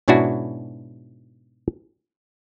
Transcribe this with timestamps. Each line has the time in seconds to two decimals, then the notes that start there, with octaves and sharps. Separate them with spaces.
0.08 G#2 B2 C#4 D4 E4 F#4